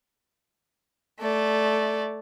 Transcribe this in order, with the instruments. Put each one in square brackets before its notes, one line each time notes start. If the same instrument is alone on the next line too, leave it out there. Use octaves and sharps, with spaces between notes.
[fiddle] A3 D5